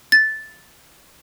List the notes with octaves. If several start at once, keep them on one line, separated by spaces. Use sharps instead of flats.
A6